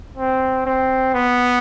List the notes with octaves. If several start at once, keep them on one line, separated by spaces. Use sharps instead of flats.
C4
C4
B3